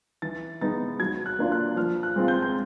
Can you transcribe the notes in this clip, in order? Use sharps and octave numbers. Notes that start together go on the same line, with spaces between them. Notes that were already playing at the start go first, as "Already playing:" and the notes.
E3 A6
G#3 B3 D#4 A6
F#3 G#6
F#6
A#3 D4 F4
F#6
F3 F6
F#6
G#3 C4 F4
G6
G6